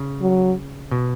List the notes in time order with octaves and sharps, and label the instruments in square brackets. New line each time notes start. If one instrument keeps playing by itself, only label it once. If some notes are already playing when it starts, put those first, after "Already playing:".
Already playing: [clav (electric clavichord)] C#3
[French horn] F#3
[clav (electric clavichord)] B2